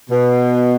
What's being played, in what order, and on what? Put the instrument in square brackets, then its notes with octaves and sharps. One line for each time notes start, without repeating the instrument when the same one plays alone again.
[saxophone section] B2